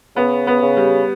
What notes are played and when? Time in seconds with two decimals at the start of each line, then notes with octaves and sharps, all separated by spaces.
0.16 C#3 B3
0.47 B3
0.62 C#3
0.77 G3